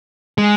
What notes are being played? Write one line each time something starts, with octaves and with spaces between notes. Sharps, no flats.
G#3